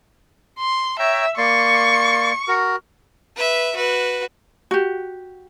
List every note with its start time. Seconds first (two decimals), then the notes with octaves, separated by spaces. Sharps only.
0.59 C6
0.99 C#5 E5 G5 A#5
1.38 A#3 D5 C6 C#6
2.48 F#4 A#4
3.36 B4 E5
3.75 F#4 B4
4.71 F#4 G4